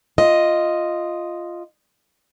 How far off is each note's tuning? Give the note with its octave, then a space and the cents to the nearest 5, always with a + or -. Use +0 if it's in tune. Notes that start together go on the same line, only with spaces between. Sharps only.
F4 -5 D#5 +0